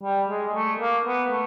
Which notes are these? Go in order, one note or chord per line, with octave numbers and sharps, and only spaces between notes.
G3
G#3
A3
A#3
B3
A3